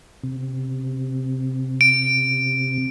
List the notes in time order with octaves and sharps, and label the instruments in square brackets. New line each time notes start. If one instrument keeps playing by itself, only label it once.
[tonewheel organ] C3
[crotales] D7